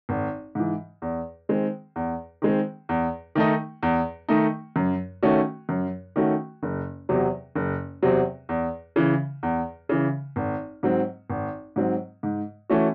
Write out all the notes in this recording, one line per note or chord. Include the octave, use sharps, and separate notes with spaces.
G#1
G#2 E3
E2
D#3 G#3 C4
E2
D#3 G#3 C4
E2
D#3 A3 D#4
E2
D#3 A3 D#4
F#2
D#3 A3 C#4 F#4
F#2
D#3 A3 C#4 F#4
F#1
E2 C3 F#3 C4
F#1
E2 C3 F#3 C4
E2
C#3 E3
E2
C#3 E3
G#1
G#2 F#3 C4
G#1
G#2 F#3 C4
G#2
E3 A3 C#4 F#4